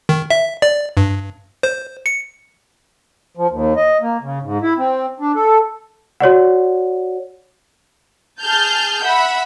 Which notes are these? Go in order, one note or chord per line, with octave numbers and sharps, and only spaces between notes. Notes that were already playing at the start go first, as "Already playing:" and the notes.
D#3
E5
D5
G2
C5
C#7
F3
D#2
D#5
A#3
C#3
G#2
E4
C4
D4
A4
F#4 C#5 D5 F#5
G#4 A5 F6 G6
E5 F#5 B5